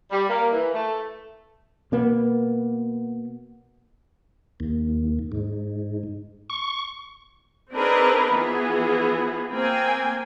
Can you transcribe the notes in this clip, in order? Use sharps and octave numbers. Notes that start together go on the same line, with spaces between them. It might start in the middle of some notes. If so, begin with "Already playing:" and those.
G3
A#3
E3
A3
B2 A#3 B3
D#2
G#2
C#6
C4 D4 D#4 G#4 A#4 B4
E3 F3 B3 G#4
A#3 C4 G5 G#5